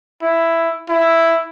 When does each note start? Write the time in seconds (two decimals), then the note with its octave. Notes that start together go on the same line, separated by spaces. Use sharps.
0.22 E4
0.89 E4